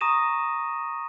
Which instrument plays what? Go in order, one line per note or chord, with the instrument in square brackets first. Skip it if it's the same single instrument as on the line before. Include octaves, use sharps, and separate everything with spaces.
[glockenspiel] A#5 C#6 D#6 A#6 D#7 E7